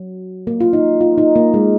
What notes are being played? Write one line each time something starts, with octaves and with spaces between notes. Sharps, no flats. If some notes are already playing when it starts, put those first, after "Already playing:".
Already playing: F#3
A#3
F4
D#4
F4
D#4
A#3
G#3